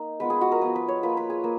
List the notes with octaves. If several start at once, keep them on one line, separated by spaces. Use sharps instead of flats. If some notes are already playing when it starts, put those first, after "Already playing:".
Already playing: A#3 D#4
G#3 B3 F4 B4
G#4
F#4
A#4
F3 B3 F4 B4
B4
C#5
A#3 F4 B4
B4
G#4
A#3